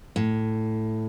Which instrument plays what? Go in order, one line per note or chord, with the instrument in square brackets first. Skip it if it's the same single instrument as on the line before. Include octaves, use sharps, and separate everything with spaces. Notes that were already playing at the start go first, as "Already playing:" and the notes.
[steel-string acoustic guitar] A2